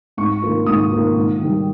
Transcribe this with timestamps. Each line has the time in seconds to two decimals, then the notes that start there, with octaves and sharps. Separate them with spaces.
0.17 G#2 C#6
0.42 D#3 A#3 F4
0.66 G#2 D#6
0.91 D#3 A#3 F4
1.16 G#2
1.40 D#3 G3